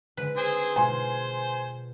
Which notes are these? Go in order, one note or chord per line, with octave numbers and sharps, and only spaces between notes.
D3 G#3 B4
C4 G#4 C5
B2 G#3 F4 C5 G#5 C6